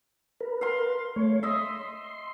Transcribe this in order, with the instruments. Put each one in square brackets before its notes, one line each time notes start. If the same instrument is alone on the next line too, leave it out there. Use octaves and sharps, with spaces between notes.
[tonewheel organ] A#4 B4
[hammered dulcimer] F5 C6
[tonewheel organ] A3 C#5
[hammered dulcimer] D#5 E5 [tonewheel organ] C6